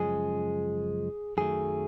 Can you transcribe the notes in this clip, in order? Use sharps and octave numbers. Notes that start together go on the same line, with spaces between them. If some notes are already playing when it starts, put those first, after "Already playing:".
Already playing: F#2 C#3 F3 G#3 G#4
F#2 D#3 F#3 A3 G#4